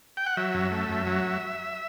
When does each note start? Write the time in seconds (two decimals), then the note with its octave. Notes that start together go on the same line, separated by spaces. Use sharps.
0.17 G5
0.26 F#5
0.37 F#3 E5
0.54 F#2
0.72 A3
0.89 F#2
1.07 F#3